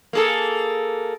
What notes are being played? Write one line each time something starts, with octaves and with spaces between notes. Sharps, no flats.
A#3 G#4 A4